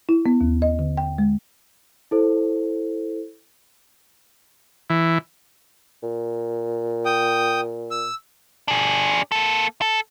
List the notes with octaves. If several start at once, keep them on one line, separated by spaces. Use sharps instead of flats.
E4
B3
D#2
D#5
D3
G5
G#3
E4 A4 C5
E3
A#2
G5 D#6
E6
D4 G#4
A#3 A4
A4